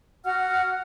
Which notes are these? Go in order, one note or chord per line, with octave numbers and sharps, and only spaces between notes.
F#4 F#5 F6